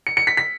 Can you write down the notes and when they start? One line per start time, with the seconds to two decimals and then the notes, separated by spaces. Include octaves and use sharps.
0.07 C#7
0.17 C#7
0.27 B6
0.37 B6